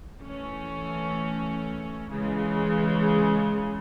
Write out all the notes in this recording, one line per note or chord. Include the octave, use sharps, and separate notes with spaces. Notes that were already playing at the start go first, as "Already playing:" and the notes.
E3 A3 C#4
C#3 E3 G#3